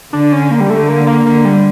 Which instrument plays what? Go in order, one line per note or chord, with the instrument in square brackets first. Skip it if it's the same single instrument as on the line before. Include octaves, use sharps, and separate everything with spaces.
[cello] D3 [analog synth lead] D4
[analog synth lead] C#4
A#3
G3
[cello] D3 [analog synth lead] A3
[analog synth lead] A#3
A#3
[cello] D3 [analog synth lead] A#3
[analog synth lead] G3